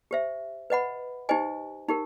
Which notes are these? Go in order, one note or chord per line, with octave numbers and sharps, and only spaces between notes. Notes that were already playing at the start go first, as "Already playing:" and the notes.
G4 C5 E5
B4 D#5 F#5 B5
D#4 G4 C5 D#5 G#5
D#4 G4 A#4